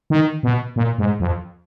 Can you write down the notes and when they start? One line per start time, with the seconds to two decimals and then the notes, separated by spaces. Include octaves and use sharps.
0.10 D#3
0.43 B2
0.76 A#2
0.98 G#2
1.20 F2